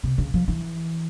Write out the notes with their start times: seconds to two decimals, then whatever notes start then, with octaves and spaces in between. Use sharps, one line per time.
0.03 C3
0.18 C#3
0.34 F3
0.48 E3